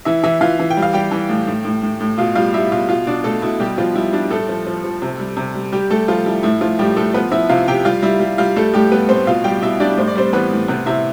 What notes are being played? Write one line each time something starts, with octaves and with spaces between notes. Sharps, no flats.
E3 E4 E5
E3 E4 E5
E3 F4 F5
E3
G5
G3
F5
G3 G4 G5
E3
A2
A2
A2
A2
A2
B2 F4 F5
G3 F4 F5
G3 E4 E5
B2 F4 F5
B2 F4 F5
B2 D4 D5
B2 A3 A4
B2 E4
B2 G3 G4
B2 F3 F4
G3 E4
G3 D4
A2 A3 A4
F3
F3
F3
C3
G3
C3
G3
G3 G4
G3 A3 A4
F3 G3 F4
G3 E4
A2 E4
A2 F3 F4
A2 G3 G4
A2 A3 A4
F3 B3 B4
F3 E4 E5
C3 F4 F5
C3 G4 G5
G3 F4 F5
G3 E4 E5
G3
G3 F4 F5
G3 A3 A4
A2 G3 G4
G3 B3 B4
A2 C4 C5
B2 F4 F5
G3 G4 G5
B2 E4 E5
G3 D4 D5
A2 C5
D5
G3 C4 C5
E3 B3 B4
A2
C3 B3 B4
C3 E4 E5